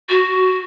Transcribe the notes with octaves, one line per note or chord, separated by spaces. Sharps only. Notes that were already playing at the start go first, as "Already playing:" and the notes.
F#4